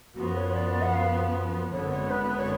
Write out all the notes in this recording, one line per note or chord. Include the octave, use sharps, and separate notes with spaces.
F#2 F3 B3 F#4
C#5
C#5
D5
F#5
F5
G#1 F#2 D3 G#3 B3 C#5
C#5
B4
C#5